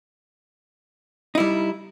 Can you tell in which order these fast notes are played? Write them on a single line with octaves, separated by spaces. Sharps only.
D#4 E4 G3